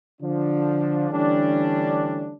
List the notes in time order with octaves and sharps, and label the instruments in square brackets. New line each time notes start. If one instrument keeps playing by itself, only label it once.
[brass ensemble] D3 F3 D4
D3 E3 G3 A3 C#4 D4